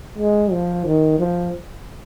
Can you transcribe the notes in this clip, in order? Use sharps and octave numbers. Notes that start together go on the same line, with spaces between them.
G#3
F3
D#3
F3